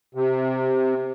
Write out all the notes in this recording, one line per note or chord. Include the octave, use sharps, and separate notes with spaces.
C3